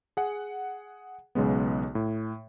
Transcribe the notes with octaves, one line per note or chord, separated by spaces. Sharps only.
G#4 F#5
B1 C#3 G#3 B3
A2